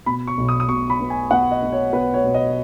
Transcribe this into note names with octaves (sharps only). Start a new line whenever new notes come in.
B2 B5
C#6
B1
D#6
D#6
B2 C#6
B5
B3
G#5
B3 F#5
D#5
B3
C#5
B3 B4
C#5
B2
D#5